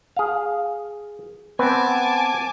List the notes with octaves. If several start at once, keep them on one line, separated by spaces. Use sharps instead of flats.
G#4 F5
B3 C4 B4 G#5 A5 D6